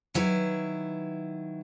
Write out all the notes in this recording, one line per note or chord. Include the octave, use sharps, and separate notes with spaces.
D#3 F#3 E4 B4